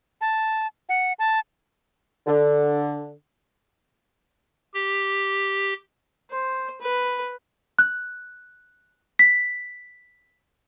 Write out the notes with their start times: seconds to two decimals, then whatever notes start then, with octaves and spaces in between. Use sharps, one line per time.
0.21 A5
0.89 F#5
1.19 A5
2.27 D3
4.74 G4
6.31 C5
6.81 B4
7.79 F#6
9.19 B6